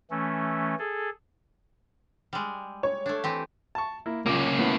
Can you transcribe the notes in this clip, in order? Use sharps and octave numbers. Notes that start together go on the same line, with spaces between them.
E3 A3 C#4
G#4 A4
G3 G#3
C#5
A3 D4
E3 C4 G4
A5 C#6
A#3 E4
C#2 A#2 A#3 C#4 D6
A2 B3 E4